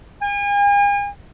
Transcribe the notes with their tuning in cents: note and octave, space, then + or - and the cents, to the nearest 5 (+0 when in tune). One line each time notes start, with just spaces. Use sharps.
G#5 -40